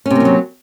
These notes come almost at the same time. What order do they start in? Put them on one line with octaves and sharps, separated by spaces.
C#4 C3 A#3 F3 F#3